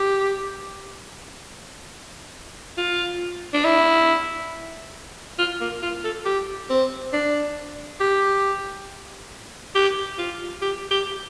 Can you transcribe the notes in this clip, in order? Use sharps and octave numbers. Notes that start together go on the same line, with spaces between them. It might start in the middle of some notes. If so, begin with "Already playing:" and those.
Already playing: G4
F4
D4
E4
F4
A#3
F4
A4
G4
C4
D4
G4
G4
F4
G4
G4